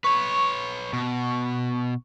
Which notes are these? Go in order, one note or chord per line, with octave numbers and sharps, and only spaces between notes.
B4 C#5 C#6
B2